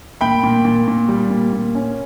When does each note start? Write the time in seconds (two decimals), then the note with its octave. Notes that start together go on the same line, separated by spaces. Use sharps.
0.21 A#2 G5 B5
0.43 A#2
0.65 A#2
0.88 A#2
1.09 G3
1.30 A#2
1.53 A#2
1.75 C#4